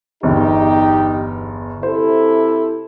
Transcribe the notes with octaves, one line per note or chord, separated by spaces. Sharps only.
G1 E2 D#4 G4
C3 E4 A4 C5